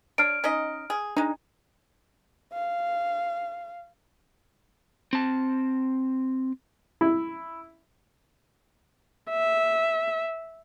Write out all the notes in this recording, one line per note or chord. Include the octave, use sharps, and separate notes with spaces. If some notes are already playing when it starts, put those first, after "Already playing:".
D4 C#5 F6 D7
C#4 D#4 D#5
G#4
G#3 D4 D#4
F5
C4 A5
E4
E5